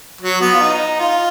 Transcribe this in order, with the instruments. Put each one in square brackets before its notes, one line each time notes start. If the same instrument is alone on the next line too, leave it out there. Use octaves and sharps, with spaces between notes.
[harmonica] F#3
B3
F4
D#4
F4